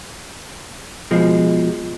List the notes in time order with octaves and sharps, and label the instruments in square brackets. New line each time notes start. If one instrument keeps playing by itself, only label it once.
[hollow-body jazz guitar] B2 F3 G#3